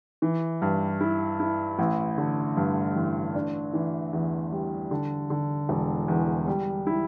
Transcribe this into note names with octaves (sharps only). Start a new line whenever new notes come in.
E3
G2
E4
E4
A1
D3
G2
A1
D4
E3
E2
G3
D3
D3
E1
E2
G3
E4